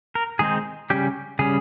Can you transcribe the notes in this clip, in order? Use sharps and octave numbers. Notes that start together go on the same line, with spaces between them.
A#4
D#3 G#3 C4 D#4 G#4
C#3 G3 C#4 G4
C#3 G3 C#4 G#4